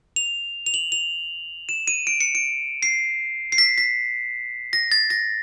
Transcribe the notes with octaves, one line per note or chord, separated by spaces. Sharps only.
F7
F7
F#7
F7
E7
D#7
D7
C#7
D7
C7
C7
B6
B6
A#6
A6
A#6